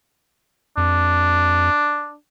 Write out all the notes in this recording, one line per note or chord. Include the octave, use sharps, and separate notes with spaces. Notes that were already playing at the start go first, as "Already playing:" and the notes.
F2 D4